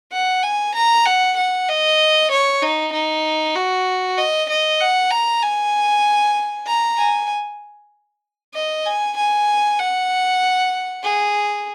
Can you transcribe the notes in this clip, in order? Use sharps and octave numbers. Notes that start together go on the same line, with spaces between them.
F#5
G#5
A#5
F#5
F#5
D#5
C#5
D#4
D#4
F#4
D#5
D#5
F#5
A#5
G#5
A#5
G#5
D#5
G#5
G#5
F#5
G#4